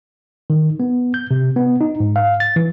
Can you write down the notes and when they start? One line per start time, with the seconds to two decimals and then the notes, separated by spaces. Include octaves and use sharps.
0.50 D#3
0.80 B3
1.14 G6
1.31 C3
1.56 B3
1.81 D#4
2.00 G#2
2.16 F5
2.40 A6
2.56 E3